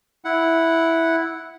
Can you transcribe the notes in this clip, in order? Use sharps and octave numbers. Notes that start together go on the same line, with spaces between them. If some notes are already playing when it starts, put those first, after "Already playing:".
E4 F#5